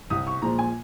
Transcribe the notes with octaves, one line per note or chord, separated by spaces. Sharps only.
C2 D#6
C#6
A#2 F3 G#3 A#5
G#5